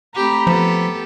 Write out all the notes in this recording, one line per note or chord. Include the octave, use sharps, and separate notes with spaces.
A3 C4 G4 A#5 B5
F3 B3 G4 A4